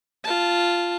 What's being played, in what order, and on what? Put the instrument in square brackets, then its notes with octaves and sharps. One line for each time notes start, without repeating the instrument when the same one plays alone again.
[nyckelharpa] F4 A5